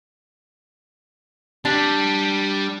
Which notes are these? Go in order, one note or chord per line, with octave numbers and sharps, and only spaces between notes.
G3 D4